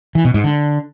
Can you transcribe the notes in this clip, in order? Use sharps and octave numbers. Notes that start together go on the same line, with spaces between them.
E3
B2
G#2
D3